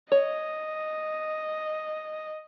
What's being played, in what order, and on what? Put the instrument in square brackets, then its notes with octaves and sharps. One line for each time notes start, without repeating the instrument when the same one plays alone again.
[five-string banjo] C#5 [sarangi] D#5